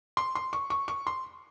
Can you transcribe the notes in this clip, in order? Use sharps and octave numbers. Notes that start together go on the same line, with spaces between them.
C6
C6
C#6
C#6
C#6
C6